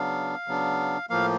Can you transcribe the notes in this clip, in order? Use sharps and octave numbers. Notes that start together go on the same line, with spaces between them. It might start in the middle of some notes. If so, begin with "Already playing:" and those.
Already playing: C#3 F#3 B3 D4 F5
C#3 F#3 B3 D4
A2 F3 A#3 F5